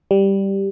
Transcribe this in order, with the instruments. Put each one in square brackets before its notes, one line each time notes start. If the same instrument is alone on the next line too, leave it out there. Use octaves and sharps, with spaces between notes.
[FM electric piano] G3